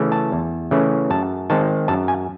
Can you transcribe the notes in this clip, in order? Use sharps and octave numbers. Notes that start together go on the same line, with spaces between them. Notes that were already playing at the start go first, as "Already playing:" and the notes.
Already playing: C#3 E3 A3 C#4
A5
E2
C#3 E3 A3 C#4
F#2 A5
D#3 G#3 C4 A5
F#2 A5
G#5